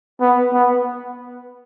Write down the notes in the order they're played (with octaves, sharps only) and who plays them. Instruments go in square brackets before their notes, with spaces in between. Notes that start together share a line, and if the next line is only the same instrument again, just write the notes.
[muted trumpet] B3
B3